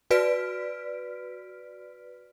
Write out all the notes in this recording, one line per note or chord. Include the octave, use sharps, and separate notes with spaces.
F#4 B4 D5 F6 B6 D7